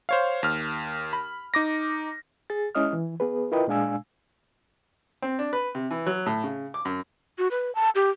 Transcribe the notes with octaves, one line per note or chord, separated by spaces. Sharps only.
C5 C#5 F5
D#2 F6
B5
D#4 D6 A#6
G#4 A6
G#3 C#4 E4 D#5 D#6 F6
E3
B3 G#4 B4
E4 F4 A#4 B4 D#5 G5
A#2 G#3 D4 F5 G#5 E6
C4
D4
B4
C3
E3
F#3
A2
C#3
D6
F#2
F#4
B4
A5
G4